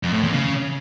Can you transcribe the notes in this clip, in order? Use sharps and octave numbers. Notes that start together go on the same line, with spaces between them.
F2
A2
E2
C#3